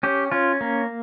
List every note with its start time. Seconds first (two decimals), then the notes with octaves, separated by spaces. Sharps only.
0.03 C#4 G4
0.32 C#4 F4
0.61 A#3